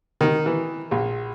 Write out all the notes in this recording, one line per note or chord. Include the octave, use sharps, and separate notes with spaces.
D#3
E3
A#1